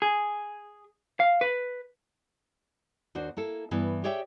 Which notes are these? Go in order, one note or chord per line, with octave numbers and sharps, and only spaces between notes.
G#4
F5
B4
D#2 D4 F#4 C5
A#3 E4 A4
G2 E3 B3 E4 B4
G4 G#4 C#5 D5 E5 G5